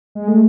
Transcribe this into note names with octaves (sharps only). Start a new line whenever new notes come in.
G#3
A3